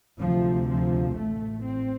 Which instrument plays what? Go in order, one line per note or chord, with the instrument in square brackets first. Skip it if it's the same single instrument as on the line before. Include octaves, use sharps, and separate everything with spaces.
[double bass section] D2 C3 F3
F3
A1 A2 A3
C4